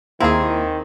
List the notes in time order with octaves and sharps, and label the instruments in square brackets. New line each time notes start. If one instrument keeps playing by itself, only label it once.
[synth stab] D#2 A#3 E4 [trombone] D#3 [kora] C4 G#4